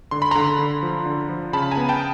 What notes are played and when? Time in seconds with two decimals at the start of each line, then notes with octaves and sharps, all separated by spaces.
0.11 D3 C6
0.22 B5
0.31 D3 A#5 C6
0.59 D3
0.83 F3
1.06 D3
1.29 F3
1.53 C#3 A5 B5
1.71 G#5 A#5
1.77 B3
1.89 G5 A5